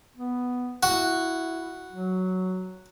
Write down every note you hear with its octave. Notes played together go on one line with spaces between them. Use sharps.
B3
E4 F#4
F#3